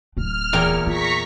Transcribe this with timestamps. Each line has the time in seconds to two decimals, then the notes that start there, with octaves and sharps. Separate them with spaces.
0.17 D1 D4 F6
0.53 E2 A#2 G5
0.86 F4 A#5 C#6 B6